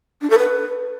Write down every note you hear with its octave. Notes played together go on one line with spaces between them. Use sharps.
D4
A4
B4